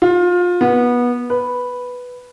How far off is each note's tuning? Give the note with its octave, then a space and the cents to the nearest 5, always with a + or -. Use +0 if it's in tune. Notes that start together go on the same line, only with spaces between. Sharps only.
F4 +25
B3 -20
B4 +0